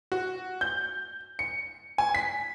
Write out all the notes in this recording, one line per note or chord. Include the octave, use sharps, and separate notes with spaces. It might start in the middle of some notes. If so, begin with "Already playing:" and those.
F#4
G6
C#7
G#5
B6